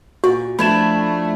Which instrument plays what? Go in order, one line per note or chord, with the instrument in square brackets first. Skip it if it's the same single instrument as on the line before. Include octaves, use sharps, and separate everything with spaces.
[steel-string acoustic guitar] A#2 [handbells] F#4
[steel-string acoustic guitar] F3 D4 E4 [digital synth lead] A3 [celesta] B5 G#6 E7